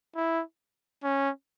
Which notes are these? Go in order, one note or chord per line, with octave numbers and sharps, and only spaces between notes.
E4
C#4